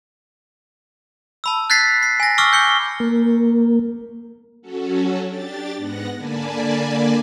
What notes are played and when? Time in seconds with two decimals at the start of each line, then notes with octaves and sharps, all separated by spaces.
1.44 A5 B5 E6
1.70 F#6 G#6 A6 B6 C7
2.03 A6 C7
2.20 G#5 A#6
2.38 C#6 D6 E6 F6 G7
2.53 G6 C#7 G7
3.00 A#3
4.62 F#3 C#4 F#4 A4
5.26 D4 G4 A6
5.76 G#2 B3 F#5 F#6 A#6
6.16 D3 A#3 D5 G#5 A5 B5